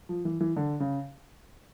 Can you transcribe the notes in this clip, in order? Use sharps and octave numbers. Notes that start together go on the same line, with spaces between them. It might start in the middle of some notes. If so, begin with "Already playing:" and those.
F3
E3
E3
D3
C#3